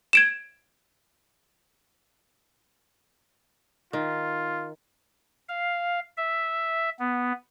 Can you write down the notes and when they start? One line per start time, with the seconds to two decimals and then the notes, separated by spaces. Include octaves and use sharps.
0.13 G#6 D7 E7
3.93 D#3 F4
5.49 F5
6.17 E5
6.99 B3